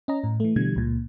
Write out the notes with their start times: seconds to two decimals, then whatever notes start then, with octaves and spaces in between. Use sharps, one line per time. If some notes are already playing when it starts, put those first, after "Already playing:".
0.08 C#4 D#5 A#5
0.24 A2
0.40 E3 A3
0.56 B2 D3 E3 G3 G#6
0.76 C#2 A#2